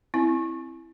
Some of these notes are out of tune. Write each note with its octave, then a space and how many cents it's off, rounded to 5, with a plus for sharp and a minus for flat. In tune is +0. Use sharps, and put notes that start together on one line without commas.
C4 +0 E4 +0